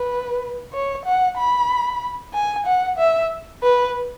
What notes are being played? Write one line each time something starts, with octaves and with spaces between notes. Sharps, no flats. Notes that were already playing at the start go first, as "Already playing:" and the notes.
Already playing: B4
C#5
F#5
B5
G#5
F#5
E5
B4